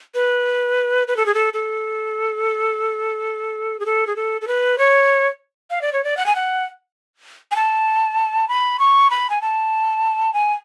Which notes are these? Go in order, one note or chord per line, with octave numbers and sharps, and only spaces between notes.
B4
B4
A4
G#4
A4
A4
G#4
A4
G#4
A4
A4
B4
C#5
F5
D5
C#5
D5
F#5
G#5
F#5
G#5
A5
B5
C#6
B5
G#5
A5
G#5